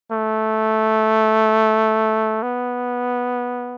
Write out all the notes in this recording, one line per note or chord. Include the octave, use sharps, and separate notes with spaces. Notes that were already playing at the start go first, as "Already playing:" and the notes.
A3
B3